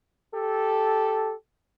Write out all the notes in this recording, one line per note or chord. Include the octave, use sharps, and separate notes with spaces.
G4 A4